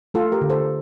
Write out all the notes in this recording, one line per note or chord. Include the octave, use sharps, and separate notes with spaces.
A3 F4 A4
G4 A#4
D3
A4 C5